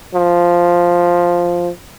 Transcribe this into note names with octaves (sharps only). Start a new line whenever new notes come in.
F3